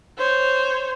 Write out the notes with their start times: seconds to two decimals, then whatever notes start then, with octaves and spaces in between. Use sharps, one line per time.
0.18 C5 C#5